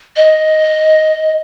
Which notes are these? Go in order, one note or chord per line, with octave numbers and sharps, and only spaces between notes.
D#5